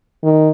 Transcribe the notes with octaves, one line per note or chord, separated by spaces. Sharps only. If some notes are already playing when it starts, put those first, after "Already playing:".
D#3